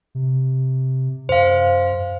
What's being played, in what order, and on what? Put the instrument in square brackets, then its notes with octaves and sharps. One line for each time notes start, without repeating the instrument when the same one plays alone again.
[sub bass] C3
[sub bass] F#2 [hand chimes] C5 F5